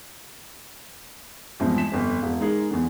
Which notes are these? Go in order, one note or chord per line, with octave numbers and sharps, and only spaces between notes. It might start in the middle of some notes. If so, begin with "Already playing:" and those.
E2 G2 C3 F3 G#3
B6 E7
G1 F2
E1
G#3 D#4 G#4 A#4
E2 D3